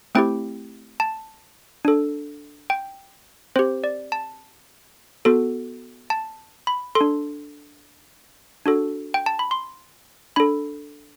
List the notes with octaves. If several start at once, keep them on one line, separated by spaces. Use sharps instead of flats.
A3 C4 E4 G4 G5
A5
D4 A4
G5
C4 G4 C5
D5
A5
B3 F#4 A4
A5
B5
A4 C6
D4
D4 F#4 A4
G5
A5
B5
C6
D4 A4 B5